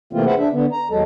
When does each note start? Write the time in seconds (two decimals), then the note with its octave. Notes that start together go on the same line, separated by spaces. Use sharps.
0.13 C3 E3 A3 A#3 C4 F4
0.26 G#4 B4 C5 E5 F#5
0.38 D4 E5
0.52 D3 B3
0.72 A#5
0.91 D#2 F#3 G#3 A4